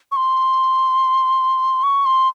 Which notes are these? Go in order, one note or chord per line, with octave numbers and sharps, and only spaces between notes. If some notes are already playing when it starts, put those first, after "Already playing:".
C#6
C6
C#6
C6